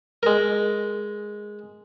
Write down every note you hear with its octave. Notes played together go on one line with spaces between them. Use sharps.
G#3 A#4